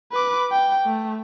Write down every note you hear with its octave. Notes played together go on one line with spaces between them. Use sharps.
B4 D6
G5
A3